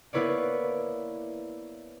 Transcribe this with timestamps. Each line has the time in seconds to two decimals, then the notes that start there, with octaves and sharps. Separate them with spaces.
0.13 A#3 B3 E4 B4 C#5 D5